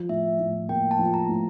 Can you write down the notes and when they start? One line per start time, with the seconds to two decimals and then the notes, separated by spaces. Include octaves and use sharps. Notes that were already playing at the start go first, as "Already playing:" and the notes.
Already playing: F3
0.09 A2 E5
0.39 A2
0.69 A#3 G5
0.91 A5
0.99 F3
1.14 A#5
1.29 A2